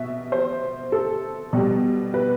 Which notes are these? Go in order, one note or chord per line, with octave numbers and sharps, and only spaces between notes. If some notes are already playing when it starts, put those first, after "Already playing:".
Already playing: B2 E5
C5
A4
B2 G3
B4